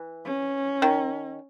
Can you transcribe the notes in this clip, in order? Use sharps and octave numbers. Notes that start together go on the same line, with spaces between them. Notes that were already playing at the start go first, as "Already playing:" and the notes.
Already playing: E3
C#4
D#3